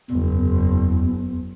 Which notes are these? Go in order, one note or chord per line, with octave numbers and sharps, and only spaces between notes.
F#1 E2